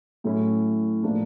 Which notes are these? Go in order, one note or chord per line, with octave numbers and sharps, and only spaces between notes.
A2 F#3 A3 C#4 E4
A2 F3 A#3 D4